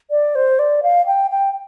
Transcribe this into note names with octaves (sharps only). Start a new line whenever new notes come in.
D5
C5
D5
F5
G5
G5